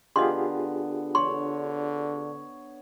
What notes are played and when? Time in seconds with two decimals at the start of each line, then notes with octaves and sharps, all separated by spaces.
0.16 D3 B3 F4 G4 G#4 D#5 C6
1.15 D3 C#5 C6